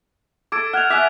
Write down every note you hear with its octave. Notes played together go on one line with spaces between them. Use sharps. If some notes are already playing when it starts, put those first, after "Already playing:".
A4 D6 G#6 D7
F#5 F6 G#6 F7
E5 F#5 G#5 D6 F#6 B6